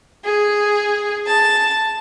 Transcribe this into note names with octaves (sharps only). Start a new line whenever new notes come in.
G#4
A5